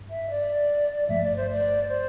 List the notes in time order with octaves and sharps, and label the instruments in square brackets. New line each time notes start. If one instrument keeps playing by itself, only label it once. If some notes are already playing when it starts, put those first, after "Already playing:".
Already playing: [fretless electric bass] G2
[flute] E5
D5
[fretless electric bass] G1 G2 F3 A3 [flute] E5
[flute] D5
C5
D5
C5